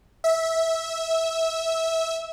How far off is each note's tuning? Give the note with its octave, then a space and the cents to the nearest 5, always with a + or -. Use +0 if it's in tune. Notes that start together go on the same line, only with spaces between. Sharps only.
E5 -15